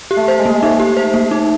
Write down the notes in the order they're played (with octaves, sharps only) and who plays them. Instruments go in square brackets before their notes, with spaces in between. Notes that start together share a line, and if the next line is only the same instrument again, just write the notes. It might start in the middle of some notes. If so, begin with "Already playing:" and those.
[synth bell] G4
[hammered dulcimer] A3
[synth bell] C5
[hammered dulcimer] G#3
[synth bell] A#3
[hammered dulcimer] A3 [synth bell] D#4
[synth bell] G4
C5
A#3
D#4